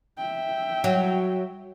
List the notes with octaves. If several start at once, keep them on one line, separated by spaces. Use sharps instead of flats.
E5 G5
F#3